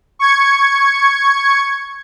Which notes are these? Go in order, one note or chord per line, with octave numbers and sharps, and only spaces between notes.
C#6 G#6 C#7